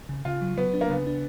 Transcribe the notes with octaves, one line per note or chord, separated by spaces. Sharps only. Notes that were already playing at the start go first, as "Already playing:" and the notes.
C#3
C#3 F4
F#3
F#3 B3
D4
A#3
C#3 B3
D4